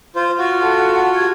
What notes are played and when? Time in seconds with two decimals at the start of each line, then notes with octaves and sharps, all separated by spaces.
0.16 F4 C5
0.39 F4 F#4
0.62 A4 F#5 A5
1.16 G4 G#6